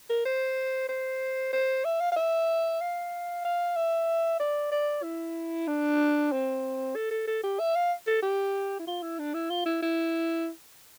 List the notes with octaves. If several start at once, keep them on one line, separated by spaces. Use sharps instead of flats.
A#4
C5
C5
C5
E5
F5
F5
E5
F5
F5
E5
D5
D5
E4
D4
C4
A4
A4
A4
G4
E5
F5
A4
G4
E4
F4
E4
D4
E4
F4
E4
E4